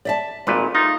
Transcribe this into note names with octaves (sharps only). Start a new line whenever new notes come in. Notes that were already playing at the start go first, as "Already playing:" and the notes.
D5 E5 A5
G#1 A#2 A3 B4
D#4 F4